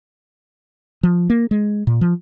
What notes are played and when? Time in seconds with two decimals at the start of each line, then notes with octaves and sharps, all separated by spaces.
1.03 F3
1.30 A#3
1.51 G#3
1.87 A#2
2.01 F3